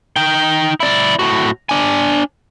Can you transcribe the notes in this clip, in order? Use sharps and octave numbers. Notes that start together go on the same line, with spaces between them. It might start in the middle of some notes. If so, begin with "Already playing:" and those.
D#4 G5
E4 D5
A2 F#4
D4 G#5